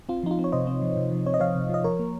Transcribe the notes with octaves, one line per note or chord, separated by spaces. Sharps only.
C4 F4
F3 D#4
F4
C4
C#5
C3 C5 D#5
C4
F3
C3
F3
C4 C#5
D#5
F3 C#5 F5
C3
F3 D#5
F3 A#4 C#5
A#3